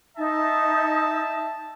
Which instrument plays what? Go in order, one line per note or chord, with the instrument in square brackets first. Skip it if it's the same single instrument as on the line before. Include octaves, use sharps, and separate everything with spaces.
[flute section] D#4 [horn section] E5 A5